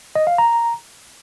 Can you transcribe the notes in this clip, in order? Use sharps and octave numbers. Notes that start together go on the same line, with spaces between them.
D#5
F5
A#5